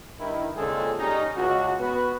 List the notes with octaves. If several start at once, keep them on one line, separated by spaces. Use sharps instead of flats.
G2 D#3 E4
A#2 C#3 G#3 C4 G#4 A4
G3 C#4 D#4
C#2 F#4
B3 F#4 B4